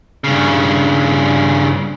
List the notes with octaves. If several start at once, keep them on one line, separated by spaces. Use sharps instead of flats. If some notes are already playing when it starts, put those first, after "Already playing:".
G2 C#3